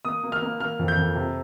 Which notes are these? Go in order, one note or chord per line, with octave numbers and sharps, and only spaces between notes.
A#3 D#6
A#3
F6
A#3
A#3 F6
F2
G6
F2
C3